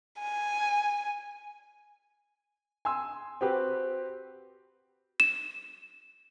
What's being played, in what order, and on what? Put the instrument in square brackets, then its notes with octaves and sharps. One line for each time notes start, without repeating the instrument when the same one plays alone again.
[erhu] G#5
[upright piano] G#5 C6 E6
C4 F#4 G4 B4
[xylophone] E7